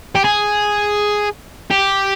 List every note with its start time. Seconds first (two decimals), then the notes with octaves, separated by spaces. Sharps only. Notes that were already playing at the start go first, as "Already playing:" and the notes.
0.15 G4
0.25 G#4
1.71 G4